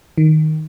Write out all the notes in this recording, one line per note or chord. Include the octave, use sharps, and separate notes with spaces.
D#3